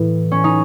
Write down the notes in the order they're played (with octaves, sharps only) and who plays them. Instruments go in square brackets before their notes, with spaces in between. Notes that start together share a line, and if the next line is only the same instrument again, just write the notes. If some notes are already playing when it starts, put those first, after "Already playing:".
Already playing: [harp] A2 E3
C#4
D#4